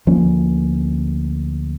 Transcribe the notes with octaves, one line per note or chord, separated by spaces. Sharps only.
D2 F3 A#3 C#4